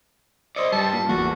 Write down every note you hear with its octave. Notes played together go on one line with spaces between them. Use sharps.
C5 D5 D#5 C6 E6 C#7
G2 G3 A5
A#3 F4
G#1 E2 A3 A#3 F#4